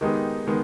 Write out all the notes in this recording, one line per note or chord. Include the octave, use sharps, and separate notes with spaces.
D#3 G#3 B3 D#4 G4
D#3 G#3 B3